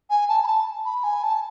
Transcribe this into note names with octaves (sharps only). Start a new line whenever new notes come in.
G#5
A5
B5
A5
B5
G#5
A5